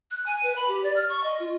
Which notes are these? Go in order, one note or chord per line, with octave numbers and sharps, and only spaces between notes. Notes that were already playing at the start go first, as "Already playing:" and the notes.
F#6
G#5
B4
B5
G4
D5
F6
C#6
D#5
F4